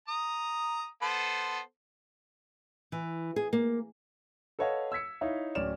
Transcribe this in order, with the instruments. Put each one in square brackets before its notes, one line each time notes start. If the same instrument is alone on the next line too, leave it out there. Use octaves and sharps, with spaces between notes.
[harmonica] A#5 D#6
B3 A4 C5
[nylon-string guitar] E3
G#4
A#3
[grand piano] A4 B4 C#5 D#5 F5 F#5
E6 G#6 B6 C#7
D#4 E4 C#5 E5 F5
D1 C#4 D5 F6 E7